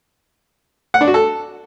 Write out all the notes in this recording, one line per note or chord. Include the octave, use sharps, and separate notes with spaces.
F#5
D4
F#4
A4